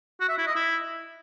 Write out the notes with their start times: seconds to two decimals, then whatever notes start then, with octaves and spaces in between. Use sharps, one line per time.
0.20 F#4
0.29 E5
0.38 E4
0.47 D#5
0.56 E4